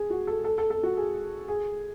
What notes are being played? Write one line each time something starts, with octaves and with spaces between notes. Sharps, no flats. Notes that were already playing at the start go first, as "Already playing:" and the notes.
Already playing: G#4
F#4
A4
A4
A4
A4
F#4
G#4
G#4